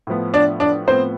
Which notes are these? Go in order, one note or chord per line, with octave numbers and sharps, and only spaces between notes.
A2 F3 B3
D4 D5
D4 D5
A2 F3 B3 C4 C5